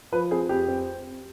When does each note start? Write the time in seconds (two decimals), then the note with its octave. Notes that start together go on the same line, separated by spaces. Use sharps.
0.12 F3 B4
0.31 C4 G#4
0.49 F2 G4
0.68 C4